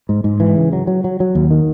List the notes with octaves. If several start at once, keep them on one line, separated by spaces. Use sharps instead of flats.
G#2
G#2
E3
C#3
F#3
F#3
F#3
F#3
D#2
D#3